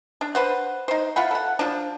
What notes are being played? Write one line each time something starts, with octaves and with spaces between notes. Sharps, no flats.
D4
B4 C5 F#5
D#4 C5
F4 E5 F#5 B5
A4 F#5
F3 D4